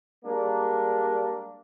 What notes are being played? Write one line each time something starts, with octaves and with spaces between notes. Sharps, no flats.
G3 G#3 A#3 D4